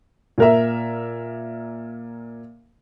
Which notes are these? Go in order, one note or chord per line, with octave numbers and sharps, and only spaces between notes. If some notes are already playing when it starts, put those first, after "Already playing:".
A#2 A#4 E5